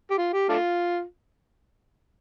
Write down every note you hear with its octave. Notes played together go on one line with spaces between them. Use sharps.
G4
F4
G4
A3 D4 F4